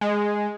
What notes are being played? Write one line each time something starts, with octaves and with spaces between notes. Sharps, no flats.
G#3